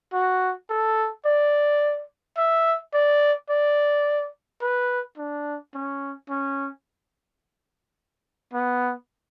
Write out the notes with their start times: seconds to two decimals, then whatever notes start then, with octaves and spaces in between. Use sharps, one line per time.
0.13 F#4
0.70 A4
1.25 D5
2.38 E5
2.93 D5
3.50 D5
4.61 B4
5.18 D4
5.74 C#4
6.29 C#4
8.53 B3